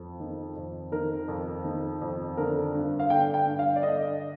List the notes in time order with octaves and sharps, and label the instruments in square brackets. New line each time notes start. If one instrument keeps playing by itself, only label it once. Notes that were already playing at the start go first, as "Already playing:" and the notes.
Already playing: [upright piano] F2
D#3
F2
D#3 A#4
F2
D#3
F2
D3 A#4
G2
F5
D3 G5
G5
G2
F5
D5
D3 D#5